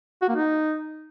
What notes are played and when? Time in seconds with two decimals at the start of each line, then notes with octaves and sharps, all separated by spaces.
0.22 F#4
0.28 A#3
0.35 D#4